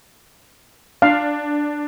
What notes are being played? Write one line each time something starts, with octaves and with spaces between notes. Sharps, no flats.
D4 F5